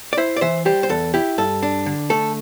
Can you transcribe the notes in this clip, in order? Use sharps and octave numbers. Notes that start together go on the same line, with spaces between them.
D5
E4 C5 E5
D5
E3 C5 E5
G3 G4 C5
C5
E2 A4
E4 G4
G2 A4
D4
D3
A3 A4